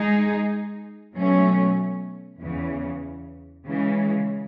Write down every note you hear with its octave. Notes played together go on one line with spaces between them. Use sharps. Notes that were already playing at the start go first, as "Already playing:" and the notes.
Already playing: G#3 D#4 G#4
B2 F#3 A3 C#4
E2 C#3 E3
C#3 E3 G#3